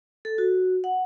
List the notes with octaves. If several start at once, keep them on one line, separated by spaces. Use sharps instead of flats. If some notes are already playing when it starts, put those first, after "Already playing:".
A4
F#4
F#5